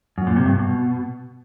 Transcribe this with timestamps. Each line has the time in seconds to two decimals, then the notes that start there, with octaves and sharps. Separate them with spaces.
0.18 F#2
0.27 A#2
0.36 C3
0.46 G2
0.55 B2